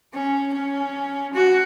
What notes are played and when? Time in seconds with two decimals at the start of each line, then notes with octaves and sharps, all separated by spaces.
0.14 C#4
0.54 C#4
1.34 F#4